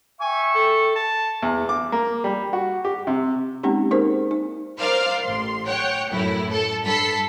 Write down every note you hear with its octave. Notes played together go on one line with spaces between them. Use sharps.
E5 G5 G#5 C#6
A4
A5
E2
D6
A#3
G3
F#4
G4
C3
G#3 A#3 C4 C#4 D#4 G4
D#4 G#4 A#4 C5
D#4
A#4 C5 D5 F5 F6
A1 C6
C#5 F#5 G5
F#2 A2 A3 E4
A4
G2 A4 B5 B6 C7